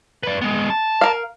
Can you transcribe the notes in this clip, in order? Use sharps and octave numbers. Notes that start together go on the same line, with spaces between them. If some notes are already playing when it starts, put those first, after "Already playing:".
B4 D5
G#3 B3
A5
A#4 F5